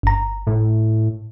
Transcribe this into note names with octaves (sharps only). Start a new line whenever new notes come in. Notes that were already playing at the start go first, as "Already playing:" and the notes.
G1 A#5
A2